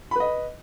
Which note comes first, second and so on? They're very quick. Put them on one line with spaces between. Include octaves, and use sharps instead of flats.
B5 B4 D#5